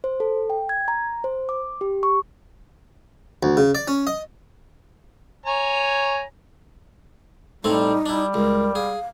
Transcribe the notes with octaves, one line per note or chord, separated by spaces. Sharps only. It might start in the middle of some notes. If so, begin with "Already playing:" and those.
C5
A4
G5
G#6
A#5
C5
D6
G4
C#6
D2
C#3
D5
C#4
D#5
C#5 G#5 A#5
A2 G3 A3 C4 D#4
G3 D4 E4
C#2 A#4
G#4 F5